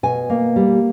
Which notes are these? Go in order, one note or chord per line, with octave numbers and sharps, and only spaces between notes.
B2 G#5
A#3
G3